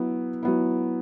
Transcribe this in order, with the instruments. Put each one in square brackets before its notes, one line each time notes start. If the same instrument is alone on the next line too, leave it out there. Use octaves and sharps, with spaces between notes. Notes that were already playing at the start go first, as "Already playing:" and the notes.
Already playing: [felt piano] F#3 B3 E4
F#3 B3 E4